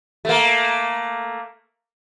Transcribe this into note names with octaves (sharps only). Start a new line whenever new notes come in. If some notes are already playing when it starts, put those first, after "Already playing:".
A3 A#3